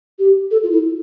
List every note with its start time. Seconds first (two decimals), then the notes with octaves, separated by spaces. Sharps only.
0.19 G4
0.51 A4
0.63 F4
0.71 E4